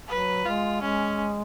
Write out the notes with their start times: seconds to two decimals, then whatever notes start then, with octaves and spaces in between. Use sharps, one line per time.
0.09 F#3 B4
0.45 G#3 F4
0.81 G#3 C#4